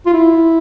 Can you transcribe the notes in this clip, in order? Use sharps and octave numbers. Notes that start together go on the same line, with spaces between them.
F4
E4